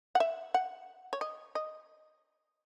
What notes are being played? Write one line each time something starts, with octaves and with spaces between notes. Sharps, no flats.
F#5
E5
F#5
C#5
D#5
D#5